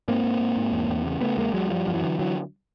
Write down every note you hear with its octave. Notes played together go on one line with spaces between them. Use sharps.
G#2 A#3 C4
G#2
G#2
G#2
E2
E2
C#3
C#3 A3 B3
E2 G#3 A#3
E2 F#3 G#3
F#2 F3 G3
F#2 F3
E3 F#3
D3
D3 E3 F#3